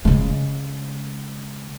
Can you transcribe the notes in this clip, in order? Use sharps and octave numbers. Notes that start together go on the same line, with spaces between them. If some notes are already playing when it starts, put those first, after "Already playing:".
C#3 G#3